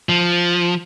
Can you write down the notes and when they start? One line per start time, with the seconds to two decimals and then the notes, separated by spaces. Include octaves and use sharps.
0.09 F3